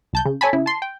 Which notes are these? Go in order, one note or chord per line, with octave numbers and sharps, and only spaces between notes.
C2 A5 G6
C#3
A4 C#5 G#5 A5 B5
C#3 E4
A5 C6
G5